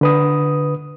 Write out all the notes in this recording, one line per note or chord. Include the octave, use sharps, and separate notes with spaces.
D3 B4 D#6